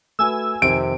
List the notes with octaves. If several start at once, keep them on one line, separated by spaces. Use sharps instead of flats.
A3 F#4 B4 G#5 E6
F2 C3 D#3 D7